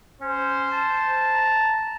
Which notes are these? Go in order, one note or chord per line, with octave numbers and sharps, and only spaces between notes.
C#4 C5
A5
A#5